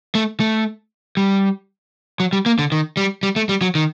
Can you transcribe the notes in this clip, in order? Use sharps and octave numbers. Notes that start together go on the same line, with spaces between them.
A3
A3
G3
F#3
G3
A#3
D3
D#3
G3
G3
A3
G3
F#3
D#3